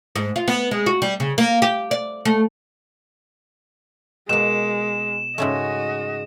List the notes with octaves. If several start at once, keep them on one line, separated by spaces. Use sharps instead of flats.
G#2
F4
B3
G#3
F#4
G3
C#3
A#3
G4
D5
A3
B2 G#3 A#3 E7
G#2 C#3 A3 F#4 D#5